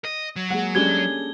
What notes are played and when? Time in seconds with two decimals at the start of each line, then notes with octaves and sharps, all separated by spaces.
0.05 D#5
0.36 F#3
0.51 G#3 A#3 G#4 F#5
0.75 G3 G#3 C#4 D4 A4 G#6 G7
0.92 G#6